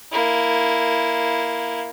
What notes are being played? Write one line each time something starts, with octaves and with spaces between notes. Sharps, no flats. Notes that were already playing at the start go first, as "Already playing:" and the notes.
A#3 E4